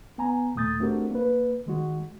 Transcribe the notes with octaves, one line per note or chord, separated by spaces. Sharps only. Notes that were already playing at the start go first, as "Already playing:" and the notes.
B3 G#5 A#5
D#2 A#2 A3 D#6 G6 A6
A3 C4 D4 F#4 G4 A#4
A#3 B4
D#3 G#3 F#4